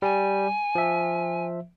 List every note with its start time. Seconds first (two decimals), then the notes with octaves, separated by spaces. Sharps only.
0.02 G3 G#5
0.75 F3 E5